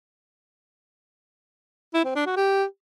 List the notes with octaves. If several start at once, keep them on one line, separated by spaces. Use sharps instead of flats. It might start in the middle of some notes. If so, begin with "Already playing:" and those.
E4
C4
D4
F#4
G4